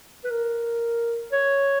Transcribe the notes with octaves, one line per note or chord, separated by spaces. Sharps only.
B4
A#4
C#5